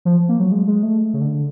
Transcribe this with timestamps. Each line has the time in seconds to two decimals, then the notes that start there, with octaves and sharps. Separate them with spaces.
0.05 F3
0.29 A#3
0.40 F#3
0.52 G#3
0.67 G#3
0.83 A3
1.13 C#3
1.21 D3